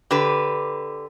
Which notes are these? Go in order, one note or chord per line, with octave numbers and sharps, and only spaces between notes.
D3 G4 B4